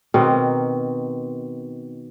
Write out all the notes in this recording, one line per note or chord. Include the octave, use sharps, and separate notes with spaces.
B2 D#3 C4 A#4